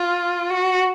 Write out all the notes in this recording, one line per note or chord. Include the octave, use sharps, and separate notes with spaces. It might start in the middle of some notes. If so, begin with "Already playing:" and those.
Already playing: F4
F#4